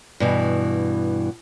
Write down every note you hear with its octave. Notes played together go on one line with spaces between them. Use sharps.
G2 B2 E3